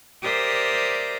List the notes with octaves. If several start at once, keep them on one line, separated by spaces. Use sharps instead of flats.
G4 A#4 C5 D5 E5 D#6